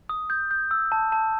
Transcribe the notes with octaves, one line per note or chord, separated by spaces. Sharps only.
D#6
G6
G6
E6
A5
A5